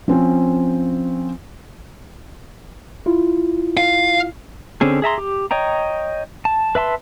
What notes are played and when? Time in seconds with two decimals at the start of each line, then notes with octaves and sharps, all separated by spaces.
0.08 F3 C4 C#4
3.06 E4 F4
3.77 F5
4.81 D3 C4 C#4 G#4
5.02 G#4 E5 A#5 C6
5.18 G4
5.51 C#5 D#5 G5 A#5
6.45 A5
6.75 B4 E5 A5 C6